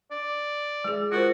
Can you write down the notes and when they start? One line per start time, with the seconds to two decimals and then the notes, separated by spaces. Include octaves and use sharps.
0.11 D5
0.84 G#3 G#4
1.12 F4 F#4 A#4 C5